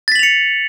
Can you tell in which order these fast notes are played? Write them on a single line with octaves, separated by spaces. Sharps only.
A6 B6 F#7 F7 C#7